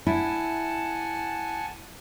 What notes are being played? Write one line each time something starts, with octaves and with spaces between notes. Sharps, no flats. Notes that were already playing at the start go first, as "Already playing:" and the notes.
E4 F#5 G#5 A5